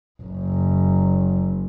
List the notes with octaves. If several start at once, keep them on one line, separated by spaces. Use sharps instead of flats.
F#1 F#2